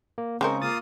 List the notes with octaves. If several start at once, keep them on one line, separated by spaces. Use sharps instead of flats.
A#3
C#3 G#3 C4 D#4 A#4 C#6
A#3 F4 D#6 A6